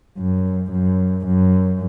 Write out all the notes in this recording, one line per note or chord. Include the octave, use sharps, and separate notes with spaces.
F#2
F#2
F#2